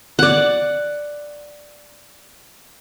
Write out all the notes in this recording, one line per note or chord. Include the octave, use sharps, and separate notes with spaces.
D5 F#5